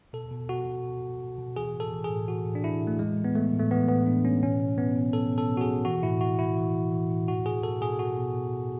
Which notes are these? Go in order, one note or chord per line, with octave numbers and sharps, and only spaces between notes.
B2 A4
B2
B2 F#4
B2
B2
B2
B2
B2
E3 G#4
A2
A4
E3
G#4
A2
E3 F#4
A2
D4
E3 E4
A2
A3
E3 G#3
A2
B3
E3 A3
A2
A3
E3 B3
A2 B3
E3 D4
A2 C#4
B2 C#4
B2
B2 B3
B2
B2 A4
B2
A4
B2
F#4
G#4
B2
E3 F#4
A2 E4
E3 F#4
A2 E4
E3
A2
E3
A2
B2 F#4
B2 G#4
B2 A4
B2 G#4
B2 F#4
B2
B2
B2